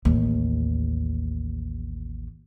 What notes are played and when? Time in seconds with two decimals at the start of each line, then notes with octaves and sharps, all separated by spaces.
0.05 A1 D#2